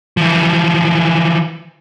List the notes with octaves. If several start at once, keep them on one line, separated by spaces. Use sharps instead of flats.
E3 F3